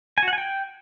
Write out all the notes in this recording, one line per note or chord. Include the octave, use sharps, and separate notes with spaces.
G#5
F#4
F#5
G#5
G5